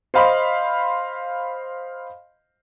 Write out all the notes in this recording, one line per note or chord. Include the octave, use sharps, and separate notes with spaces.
C5 D#5 F5 B5 C6